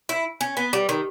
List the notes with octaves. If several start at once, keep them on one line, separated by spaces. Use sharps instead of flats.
E4
C#4
B3
G3
D#3